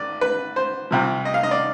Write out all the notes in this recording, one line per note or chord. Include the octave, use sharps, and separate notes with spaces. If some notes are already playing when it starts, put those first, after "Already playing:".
Already playing: G#1 D5
B4
C5
C2 C3 F3
D#5
F5
D#5
D5